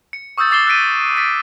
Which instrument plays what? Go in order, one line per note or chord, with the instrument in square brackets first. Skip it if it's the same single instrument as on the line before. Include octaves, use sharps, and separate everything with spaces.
[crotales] C#7
C#6 D#6 E6 G6 A6
D6 A6 C7 E7 G7
E6 F#6 A6 B6 D7 D#7
A6 B6 D7